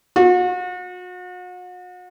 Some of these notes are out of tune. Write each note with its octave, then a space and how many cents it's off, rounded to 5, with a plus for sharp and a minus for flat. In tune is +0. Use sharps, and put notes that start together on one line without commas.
F#4 -40